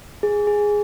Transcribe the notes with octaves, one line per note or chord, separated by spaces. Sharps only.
G#4
G#4